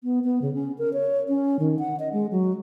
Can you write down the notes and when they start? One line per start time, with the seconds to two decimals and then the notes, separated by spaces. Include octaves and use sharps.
0.03 B3
0.24 B3
0.42 C#3
0.54 C#4
0.78 A#4
0.93 C#5
1.28 C#4
1.59 D#3
1.79 F#5
1.99 D#5
2.13 G#3
2.31 F#3